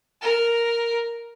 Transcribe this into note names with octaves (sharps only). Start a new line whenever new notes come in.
A#4